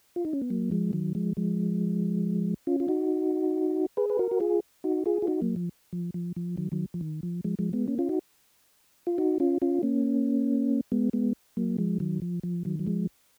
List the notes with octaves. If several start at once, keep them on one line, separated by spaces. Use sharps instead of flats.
F4
D#4
C#4
B3
F#3 A#3
F3 G#3
D#3 F#3
F3 G#3
F3 G#3
C#4 F4
F4
D#4 F#4
G#4 B4
B4
F#4 A#4
F#4
F4 G#4
D#4 F#4
F4 G#4
F4
D#4 F#4
F#3 A#3
F3
F3
F3
F3
D#3 F#3
D#3 F#3
F3
D#3
F3
F3 G#3
F3 G#3
G#3 B3
A#3 C#4
C#4 F4
D#4 F#4
F4
D#4 F#4
C#4 F4
C#4 F4
A#3 C#4
G#3 B3
G#3 B3
F#3 A#3
F3 G#3
D#3 F#3
F3
F3
D#3 F#3
F#3
F3 G#3